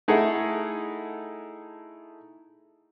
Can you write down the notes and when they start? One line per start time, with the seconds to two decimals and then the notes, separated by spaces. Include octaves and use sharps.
0.08 A3 D#4 E4 G#4 A4 F#5